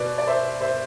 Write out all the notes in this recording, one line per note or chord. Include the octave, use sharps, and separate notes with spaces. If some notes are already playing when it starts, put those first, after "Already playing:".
Already playing: B2 B3 B4 D5
D5
C5 E5
C5 E5